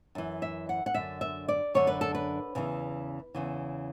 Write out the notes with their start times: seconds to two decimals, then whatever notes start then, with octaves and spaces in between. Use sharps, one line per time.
0.15 F#2 E3
0.42 E5
0.69 F#5
0.86 F#5
0.94 F#2 D3 E5
1.21 E5
1.48 D5
1.74 F#2 D3 C#5
1.87 B4
2.01 A4
2.15 B4
2.55 E2 C#3 E3
3.35 E2 C#3 E3